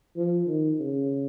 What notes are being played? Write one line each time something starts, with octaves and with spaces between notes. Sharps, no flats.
F3
D#3
C#3